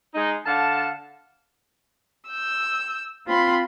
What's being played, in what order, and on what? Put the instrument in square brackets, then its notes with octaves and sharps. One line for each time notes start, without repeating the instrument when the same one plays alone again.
[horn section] G#3 D#4
D3 F5 F#5 A5
[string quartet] E6 G6
C4 F4 B5 C6